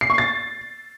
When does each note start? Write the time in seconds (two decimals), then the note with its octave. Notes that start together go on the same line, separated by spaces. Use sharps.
0.01 C7
0.10 C#6
0.18 A6